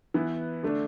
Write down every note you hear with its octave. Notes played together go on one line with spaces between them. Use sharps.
E3 B3 E4 B4
D3 A3 D4